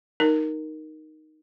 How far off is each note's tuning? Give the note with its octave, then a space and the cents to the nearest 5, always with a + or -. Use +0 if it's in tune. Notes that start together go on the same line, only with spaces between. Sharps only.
D#4 +0 A#4 +0